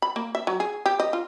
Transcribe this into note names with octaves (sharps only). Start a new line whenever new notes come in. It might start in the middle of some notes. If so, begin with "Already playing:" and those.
B5
A#3
E5
F#3
G#4
G4
D#5
F4